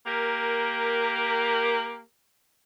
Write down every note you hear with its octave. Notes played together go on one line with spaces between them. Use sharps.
A#3 G4 A#4